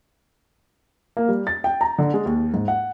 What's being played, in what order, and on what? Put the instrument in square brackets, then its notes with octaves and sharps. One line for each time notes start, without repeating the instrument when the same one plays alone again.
[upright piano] A#3
G3
A6
G5
A#5
D3
G#3
D#2
G#2
F#5